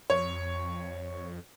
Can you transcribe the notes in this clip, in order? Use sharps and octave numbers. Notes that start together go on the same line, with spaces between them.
F2 C#5